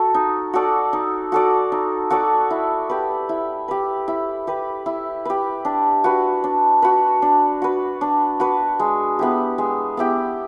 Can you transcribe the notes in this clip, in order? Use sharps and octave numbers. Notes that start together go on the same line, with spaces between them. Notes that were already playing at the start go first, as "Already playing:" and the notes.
Already playing: F#4 A4
D#4
F#4 A4 D5
D#4
F#4 A4 D5
D#4
F#4 A4 D5
E4
G4 B4
E4
G4 B4
E4
G4 B4
E4
G4 B4
D4
F#4 B4
D4
F#4 B4
D4
F#4 B4
D4
F#4 B4
G#3
B3 E4 G4
G#3
B3 E4 G4